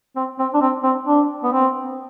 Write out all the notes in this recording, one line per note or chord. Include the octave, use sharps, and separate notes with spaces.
C4
C4
D4
C4
C4
D4
B3
C4